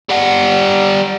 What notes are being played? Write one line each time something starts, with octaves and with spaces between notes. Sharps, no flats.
G3 F#5